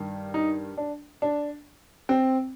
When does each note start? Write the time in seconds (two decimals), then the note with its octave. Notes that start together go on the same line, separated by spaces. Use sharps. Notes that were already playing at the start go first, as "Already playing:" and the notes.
Already playing: G2 D#3
0.34 D#4
0.77 D4
1.22 D4
2.09 C4